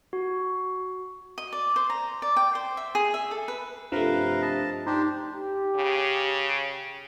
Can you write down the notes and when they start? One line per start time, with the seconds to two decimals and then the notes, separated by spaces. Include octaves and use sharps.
0.13 F#4
1.38 D#5
1.53 D5
1.76 C5
1.90 A#5
2.22 D5
2.37 G5
2.55 C5
2.77 E5
2.95 G#4
3.14 E5
3.31 A4
3.48 B4
3.92 G2 C3 F3 A3 A#4 B4 F5
4.42 D#5 A5
4.87 D4 D#4 G4 C5
5.33 G4
5.76 C#3